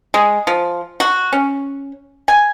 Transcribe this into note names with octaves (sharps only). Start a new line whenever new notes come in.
G#3
F3
F#4
C#4
G#5